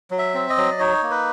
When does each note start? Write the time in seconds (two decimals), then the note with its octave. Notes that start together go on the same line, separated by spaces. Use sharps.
0.11 F#3
0.18 E5
0.34 C4
0.49 D#5
0.57 F#3
0.72 D5
0.79 D#4 C#5
1.03 A#3
1.11 B4